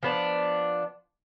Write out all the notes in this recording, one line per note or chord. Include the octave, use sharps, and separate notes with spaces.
F3 B3 D4